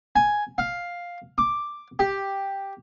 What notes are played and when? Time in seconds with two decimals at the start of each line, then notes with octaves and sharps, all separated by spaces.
0.16 G#5
0.58 F5
1.38 D6
1.99 G4